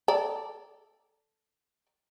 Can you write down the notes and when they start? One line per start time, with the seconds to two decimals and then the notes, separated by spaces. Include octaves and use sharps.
0.08 A4 D5